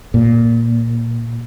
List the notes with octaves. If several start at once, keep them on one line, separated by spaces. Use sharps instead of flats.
A#2